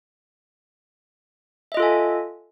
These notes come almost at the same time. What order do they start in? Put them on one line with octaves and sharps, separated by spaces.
E5 D#5 F4 A4 G#5